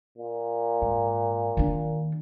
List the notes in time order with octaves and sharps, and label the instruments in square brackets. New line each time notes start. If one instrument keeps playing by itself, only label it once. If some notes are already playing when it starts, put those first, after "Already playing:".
[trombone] A#2
[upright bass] G#2
D#3 D4